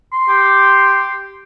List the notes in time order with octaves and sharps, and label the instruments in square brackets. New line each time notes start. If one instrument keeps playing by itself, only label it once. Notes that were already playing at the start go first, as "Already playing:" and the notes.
[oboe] C6
[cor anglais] G4